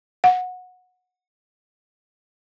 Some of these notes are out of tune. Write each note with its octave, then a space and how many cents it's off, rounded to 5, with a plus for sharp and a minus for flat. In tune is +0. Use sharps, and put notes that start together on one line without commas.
F#5 -20